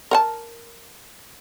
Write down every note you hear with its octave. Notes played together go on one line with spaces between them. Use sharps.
A#4 F#5 A5